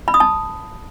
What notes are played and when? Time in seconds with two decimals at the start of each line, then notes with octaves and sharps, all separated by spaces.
0.08 B5
0.14 D#6
0.20 A5